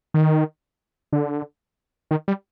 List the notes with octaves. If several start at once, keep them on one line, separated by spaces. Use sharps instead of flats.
D#3
D3
D#3
G3